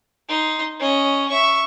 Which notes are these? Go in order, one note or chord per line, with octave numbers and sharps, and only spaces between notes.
D#4 C6
C#4 D#5
E5 C#6